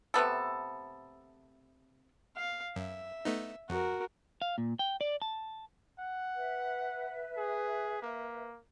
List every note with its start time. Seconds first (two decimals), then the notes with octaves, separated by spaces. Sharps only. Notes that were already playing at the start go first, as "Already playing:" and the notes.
0.14 C3 A3 B3 A4
2.36 F5
2.76 F#2 E5
3.25 A3 B3 D#4
3.69 F2 F#4 A#4
4.42 F5
4.58 A#2
4.79 G5
5.01 D5
5.22 A5
5.99 F#5
6.35 B4 E5
7.37 G#4
8.02 A#3